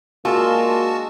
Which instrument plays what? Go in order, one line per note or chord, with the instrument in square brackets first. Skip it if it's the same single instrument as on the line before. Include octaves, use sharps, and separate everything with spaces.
[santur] G#3 D4 E6 [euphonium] A#3 [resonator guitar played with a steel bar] F4 [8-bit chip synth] F#4 A5